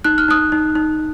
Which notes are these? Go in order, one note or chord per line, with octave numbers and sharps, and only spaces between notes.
D#4 F#6
F6
D#4 D#6 F#6
D#4
D#4